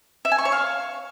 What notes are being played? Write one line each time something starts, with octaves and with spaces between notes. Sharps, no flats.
E5
G#5
C#6
C#5
F5